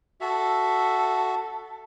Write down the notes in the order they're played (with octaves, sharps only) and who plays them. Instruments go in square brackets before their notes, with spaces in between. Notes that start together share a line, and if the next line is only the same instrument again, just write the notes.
[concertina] F#4 E5 [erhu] A4